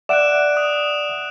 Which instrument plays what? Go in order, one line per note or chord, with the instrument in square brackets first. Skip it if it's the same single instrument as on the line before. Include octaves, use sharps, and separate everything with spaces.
[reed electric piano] D5 E5 F#5 [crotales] F#6 D7 E7
[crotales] D#6